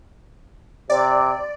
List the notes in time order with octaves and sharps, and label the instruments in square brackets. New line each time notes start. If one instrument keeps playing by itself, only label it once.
[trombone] C3 [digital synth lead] D5